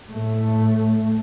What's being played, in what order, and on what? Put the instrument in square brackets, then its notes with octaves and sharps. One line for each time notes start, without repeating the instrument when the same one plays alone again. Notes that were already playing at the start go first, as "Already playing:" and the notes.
[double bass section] A2 A3